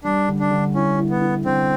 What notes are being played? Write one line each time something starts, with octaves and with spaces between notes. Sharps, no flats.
G3 D4
D3
D4
D3
C#4 E4
E4
B3
E4
D3 C4